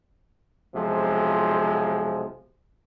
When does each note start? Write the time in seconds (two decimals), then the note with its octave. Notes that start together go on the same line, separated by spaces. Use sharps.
0.75 B1 F2 C3 F3 G#3